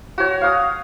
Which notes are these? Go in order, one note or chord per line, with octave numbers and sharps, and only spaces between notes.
F#4 C#5
F5 D#6